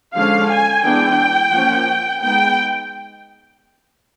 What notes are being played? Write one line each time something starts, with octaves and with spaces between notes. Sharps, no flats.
D3 F3 G#3 C#4 F5
G#5
E3 G#3 B3 D4 G5
F3 A#3 C#4
G#3 B3 D#4 G5